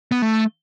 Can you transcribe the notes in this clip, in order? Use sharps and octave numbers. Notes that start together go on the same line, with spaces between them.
B3
A3